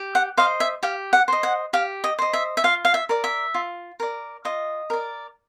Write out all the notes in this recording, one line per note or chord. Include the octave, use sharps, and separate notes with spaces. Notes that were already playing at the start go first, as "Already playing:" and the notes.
Already playing: G4
F#5
C5 D#5 F5
E5
G4 F5
F#5
C5 D#5
F#5
G4 F5
D#5
C5 D#5
E5
E5
F4 F5
F5
E5
A#4 D5
E5
F4
A#4 D5
F4 D#5
A#4 D5